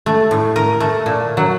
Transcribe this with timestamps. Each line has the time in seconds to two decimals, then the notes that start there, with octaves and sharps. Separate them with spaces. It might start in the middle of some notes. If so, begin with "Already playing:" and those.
0.06 A3
0.31 A2
0.56 A#4
0.80 A3
1.06 A#2
1.37 F#3